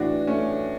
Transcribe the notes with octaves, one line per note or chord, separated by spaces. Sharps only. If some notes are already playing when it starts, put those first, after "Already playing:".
Already playing: A2 E3 D4 F#4
A3 C#4